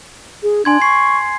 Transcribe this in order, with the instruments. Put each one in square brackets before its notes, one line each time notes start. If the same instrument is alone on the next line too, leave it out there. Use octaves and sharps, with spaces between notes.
[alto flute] G#4
[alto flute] D4 [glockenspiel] G#5 C6 G#6
[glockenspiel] G#5 C7 [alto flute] C#6